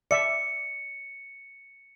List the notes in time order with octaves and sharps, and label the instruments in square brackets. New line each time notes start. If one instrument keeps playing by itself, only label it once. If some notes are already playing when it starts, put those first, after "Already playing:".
[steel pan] D5 E5 [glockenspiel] C#7